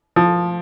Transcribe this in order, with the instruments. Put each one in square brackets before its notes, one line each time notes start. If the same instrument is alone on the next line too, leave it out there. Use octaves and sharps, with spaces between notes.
[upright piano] F3